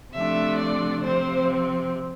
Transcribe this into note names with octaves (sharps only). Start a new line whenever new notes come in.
C3 F3 A3 D4 E5
D5
C3 F3 C4 C5